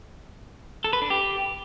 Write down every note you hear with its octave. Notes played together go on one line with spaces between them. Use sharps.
A4
B4
D4
G4